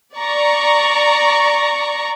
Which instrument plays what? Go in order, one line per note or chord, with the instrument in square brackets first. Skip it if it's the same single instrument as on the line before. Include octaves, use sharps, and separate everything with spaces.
[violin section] D5 A#5 C#6